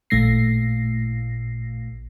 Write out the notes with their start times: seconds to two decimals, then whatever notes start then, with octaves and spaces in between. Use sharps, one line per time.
0.10 A1 A#2 A3 A#6 C7